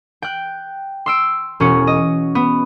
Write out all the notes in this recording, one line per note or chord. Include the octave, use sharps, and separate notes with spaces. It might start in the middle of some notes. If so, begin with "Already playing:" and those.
G5 F#6
C6 E6 D7
E1 C#4 F#4 C#7
D#5
B3